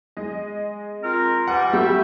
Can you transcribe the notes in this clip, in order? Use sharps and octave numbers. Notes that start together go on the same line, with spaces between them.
G#3 D#5
C4 F4 A#4
E3 G3 F#5
G3 A3 F#4 E5 G5